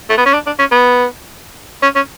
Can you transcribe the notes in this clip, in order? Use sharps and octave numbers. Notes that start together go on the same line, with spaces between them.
A3
B3
C#4
D4
D4
C#4
B3
C#4
C#4